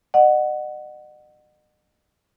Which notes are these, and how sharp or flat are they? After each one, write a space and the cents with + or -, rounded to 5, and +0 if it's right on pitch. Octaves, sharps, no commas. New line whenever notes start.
D#5 -40 F#5 +0